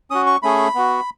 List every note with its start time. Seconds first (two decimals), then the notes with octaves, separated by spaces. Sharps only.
0.11 C#4 F#4 D#6
0.26 C#6
0.42 A3 C#4 G#4 B5
0.75 B3 F#4